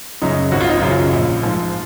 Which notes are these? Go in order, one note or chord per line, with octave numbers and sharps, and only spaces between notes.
F#2 C#3 F#3 D#4
G#1 F#4
F4
D#4
F#2 C#3 F#3 F4
A#1
G#2 F3